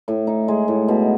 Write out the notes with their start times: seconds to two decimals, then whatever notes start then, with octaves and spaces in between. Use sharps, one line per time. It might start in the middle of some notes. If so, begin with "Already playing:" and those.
0.08 A2
0.27 D#4
0.48 G#3
0.68 A2
0.88 B2